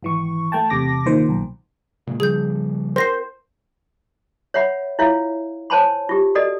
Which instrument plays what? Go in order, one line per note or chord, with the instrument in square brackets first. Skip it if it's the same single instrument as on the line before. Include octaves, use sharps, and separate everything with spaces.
[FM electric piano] G#1 E3 C#6
A3 G5 A5
E2 C3 D6 A#6
A#2 D#3 C5
B1
[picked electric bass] A#2 C#3 G#3
[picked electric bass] C#3 F3 G3 [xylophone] G#4 G6
[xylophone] A#4 A#6 C7 [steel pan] C5
[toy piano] C#5 E5 F#5 B5
E4 F4 C#5 E5 F5
C5 C#5 G#5 A5 B5 C6
F4 G4
F#4 A4 D5 D#5